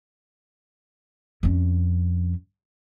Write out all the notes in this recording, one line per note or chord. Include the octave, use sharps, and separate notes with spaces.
F2 C#4